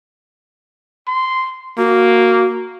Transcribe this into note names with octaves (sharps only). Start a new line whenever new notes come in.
C6
A#3 F#4